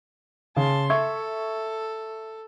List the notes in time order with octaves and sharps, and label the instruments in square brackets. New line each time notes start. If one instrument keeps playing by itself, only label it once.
[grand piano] C#3 [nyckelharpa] A5 C6
[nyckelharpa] A4 [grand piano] E5 C#6 G#6